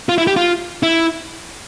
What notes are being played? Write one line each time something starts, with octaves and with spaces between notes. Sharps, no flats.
F4
E4
G4
F4
E4